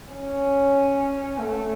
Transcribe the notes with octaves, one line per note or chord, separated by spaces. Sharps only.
C#4
A3